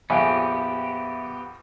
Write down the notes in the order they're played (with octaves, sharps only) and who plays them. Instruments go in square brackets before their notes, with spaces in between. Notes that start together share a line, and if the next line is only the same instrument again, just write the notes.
[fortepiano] A#1 F2 [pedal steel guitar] B3 G4 [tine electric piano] E5 B5 [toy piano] G#5